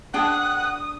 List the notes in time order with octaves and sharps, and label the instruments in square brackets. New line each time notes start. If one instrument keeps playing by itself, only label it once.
[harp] D4 [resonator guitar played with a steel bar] G#4 G5 A5 [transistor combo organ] F#5 [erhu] D#6